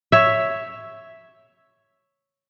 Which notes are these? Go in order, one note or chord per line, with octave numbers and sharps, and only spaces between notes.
C#5 E5